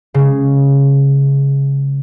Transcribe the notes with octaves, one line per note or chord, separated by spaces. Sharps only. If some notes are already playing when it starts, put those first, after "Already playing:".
C#3 G#3